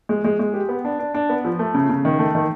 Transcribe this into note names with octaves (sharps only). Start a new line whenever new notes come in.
G#3
G#3
G#3
G4
B3
D4
D4
D4
B3
F3
A3
C#3
C#3
D#3
A3
D#3